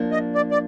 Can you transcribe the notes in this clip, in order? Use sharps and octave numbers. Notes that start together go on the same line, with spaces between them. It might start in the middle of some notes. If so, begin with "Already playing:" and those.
Already playing: F3 A#3 D4
D#5
D5
D5